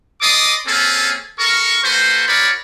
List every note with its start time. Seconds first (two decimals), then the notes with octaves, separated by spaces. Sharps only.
0.22 A4 D5 D#5 C6 D6 D#6
0.67 A#3 C4 C#4 G#4 A4
1.39 A4 A#4 C#6
1.84 A#3 F#4 A4 B4 C5
2.28 D#4 F#4 A#4 C#5 D5 B5